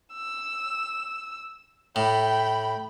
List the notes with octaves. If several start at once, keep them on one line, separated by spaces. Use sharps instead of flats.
E6
A2 G5 B5